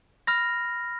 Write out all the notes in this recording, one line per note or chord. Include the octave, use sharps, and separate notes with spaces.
B5 F6 A#6